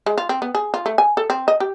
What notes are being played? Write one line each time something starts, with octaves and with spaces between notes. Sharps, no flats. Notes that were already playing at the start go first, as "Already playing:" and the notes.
G#3
F4
C4
B3
G#4
F4
A3
G#5
A4
C4
D#5
G4